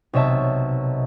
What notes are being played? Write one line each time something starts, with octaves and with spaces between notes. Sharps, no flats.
B1 C3 C#5 E5 A5